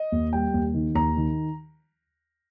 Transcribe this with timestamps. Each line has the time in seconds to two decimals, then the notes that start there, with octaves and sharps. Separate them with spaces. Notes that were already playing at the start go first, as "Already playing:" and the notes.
Already playing: D#5
0.12 D#2
0.33 G3 G5
0.54 D#2
0.74 D#3
0.95 D#2 A#5
1.16 D#3